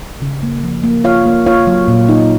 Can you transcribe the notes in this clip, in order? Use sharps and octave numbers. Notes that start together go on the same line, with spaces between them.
C#3
A#3
F3
A#3
F4 C#5 F5
A#3
F4 C#5 F5
F#3
A#2
D#4